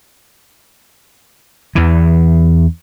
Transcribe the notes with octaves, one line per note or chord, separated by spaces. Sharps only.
E2 E3